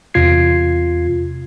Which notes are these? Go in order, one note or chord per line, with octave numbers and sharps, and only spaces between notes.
E2 C3 F4 G#6 C7